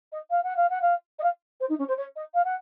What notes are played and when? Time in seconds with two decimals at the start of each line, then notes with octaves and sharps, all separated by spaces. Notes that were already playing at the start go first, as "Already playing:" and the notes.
0.12 D#5
0.30 F5
0.43 F#5
0.56 F5
0.70 F#5
0.81 F5
1.19 D#5
1.23 F5
1.60 C5
1.69 D#4
1.79 C#4
1.88 C5
1.97 C#5
2.16 D#5
2.34 F5
2.45 F#5